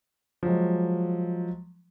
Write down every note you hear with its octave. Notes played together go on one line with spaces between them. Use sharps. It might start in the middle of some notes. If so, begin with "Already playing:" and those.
F3 F#3 G#3